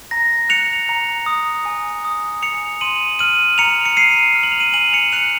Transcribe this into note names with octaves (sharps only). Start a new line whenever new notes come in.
A#5 A#6
F#6 C#7 F7
A#5
D#6
G#5
D#6
G#5 C#7 F7
C6 D#7 F#7
F6 D#7 F#7
A#5 C#7 F7
C#7
A#5 C7 D#7
F6
F#7
F7
D#7 F#7
G#5 D#7 F#7
C#7 F7
F#6 C#7 F7